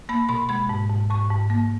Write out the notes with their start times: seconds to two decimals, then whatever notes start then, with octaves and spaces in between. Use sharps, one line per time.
0.09 A#3 B5
0.29 B2 B5
0.49 G#3 B5
0.69 G#2
0.90 G#2
1.10 G#2 C#6
1.30 G#2
1.50 A#3